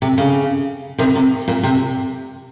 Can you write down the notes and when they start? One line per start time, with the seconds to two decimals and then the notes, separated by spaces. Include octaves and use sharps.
0.02 C3
0.18 C#3
0.98 C3 D#3
1.15 C3
1.48 A#2
1.63 C3